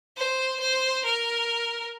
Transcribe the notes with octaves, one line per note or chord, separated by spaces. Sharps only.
C5
C5
A#4